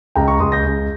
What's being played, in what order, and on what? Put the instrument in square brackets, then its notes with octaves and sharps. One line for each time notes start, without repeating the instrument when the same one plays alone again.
[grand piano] C#2 G5 A#5
A#5 C#6
C#2 C6 D#6
G6 A#6
C#2